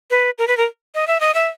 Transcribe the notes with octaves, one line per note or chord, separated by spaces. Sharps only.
B4
A#4
B4
A#4
D#5
E5
D#5
E5